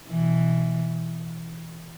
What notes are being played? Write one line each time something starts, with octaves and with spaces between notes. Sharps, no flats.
B2 E3